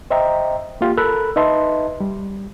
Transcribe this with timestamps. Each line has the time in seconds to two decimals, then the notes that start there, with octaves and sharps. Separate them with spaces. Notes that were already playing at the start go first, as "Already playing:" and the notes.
0.11 C5 D#5 E5 G5 A#5
0.81 A#3 F4 G4
0.98 A4 A#4 B5 E6 F#6
1.36 D#4 B4 D#5 E5 A5 C6
2.00 G3